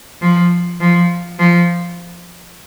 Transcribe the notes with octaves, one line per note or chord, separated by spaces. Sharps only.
F3
F3
F3